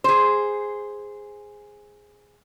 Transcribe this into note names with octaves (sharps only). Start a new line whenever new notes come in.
G#4 C5